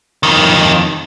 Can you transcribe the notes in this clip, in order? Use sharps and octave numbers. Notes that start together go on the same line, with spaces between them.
F2 D#3